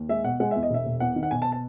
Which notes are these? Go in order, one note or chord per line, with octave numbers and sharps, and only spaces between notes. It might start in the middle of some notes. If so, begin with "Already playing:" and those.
Already playing: D#2
G#3 E5
B2 F#5
G#3 F#5
E2 E5
D#5
E1 E5
E1
E2 F#5
D#3
F#5
B2 G#5
A5
A5